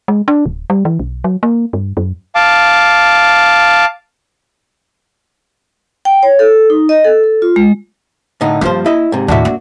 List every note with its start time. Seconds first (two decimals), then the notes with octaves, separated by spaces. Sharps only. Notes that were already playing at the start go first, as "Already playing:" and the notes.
0.08 G#3
0.28 D4
0.46 D1
0.70 G3
0.85 E3
1.00 B1
1.24 F#3
1.43 A#3
1.73 G2
1.97 F#2
2.35 F5 A5 D6
6.05 G5
6.23 C#5
6.39 A4
6.70 D#4
6.89 D#5
7.04 A4
7.24 A4
7.42 F4
7.56 G#3
8.41 A2 D3 D#4
8.61 G2 F3 A#3 B3 C5
8.86 E4 D#5
9.12 G#2 C3
9.28 D#2 A2 D4 F#4 E5
9.45 A#3